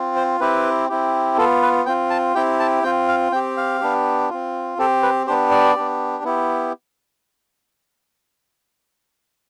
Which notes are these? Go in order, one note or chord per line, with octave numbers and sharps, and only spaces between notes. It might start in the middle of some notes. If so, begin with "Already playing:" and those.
Already playing: C4 F4
C5
C4 E4 G4 B4
C4 E4 G4
B3 F4 A4
B4
C4 F4 G5
A5
C4 E4 G4 G5
A5
C4 F4 G5
F5
C4 G4 G5
F5
B3 D4 G4
C4 F4
C4 G4 A4
B4
B3 D4 G4 C5
D5
B3 D4 G4
B3 E4 G4